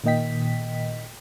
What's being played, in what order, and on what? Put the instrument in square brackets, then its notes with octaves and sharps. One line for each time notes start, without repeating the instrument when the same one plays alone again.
[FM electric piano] A#2 D#3 A#3 D#5 G5 B6